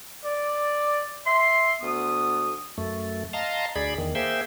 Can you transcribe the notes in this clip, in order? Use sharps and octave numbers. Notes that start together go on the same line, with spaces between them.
D5
E5 C6
D2 B3 D#6
F#2 A3
D#5 F5 A5 A#5 C6
D2 G#4 D5 B5
E2 D#3
A#3 G#4 C5 E5 G5